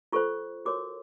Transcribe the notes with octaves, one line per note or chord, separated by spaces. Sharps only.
F4 A4 C5 C#6
F#4 A#4 C#5 D6